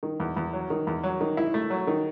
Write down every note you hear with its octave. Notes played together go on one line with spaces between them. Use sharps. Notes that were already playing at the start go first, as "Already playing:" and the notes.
D#3
E2
E2
F#3
D#3
E2
F#3
D#3
E4
A3
F#3
D#3